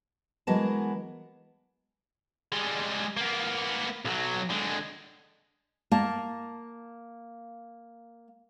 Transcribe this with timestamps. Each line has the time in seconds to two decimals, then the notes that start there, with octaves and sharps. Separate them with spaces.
0.47 E3 F#3 G#3 B3 A#4 A5
2.52 G3 G#3
3.17 A#3 B3
4.05 B1 F#3
4.50 D3 G#3
5.92 A#3 A5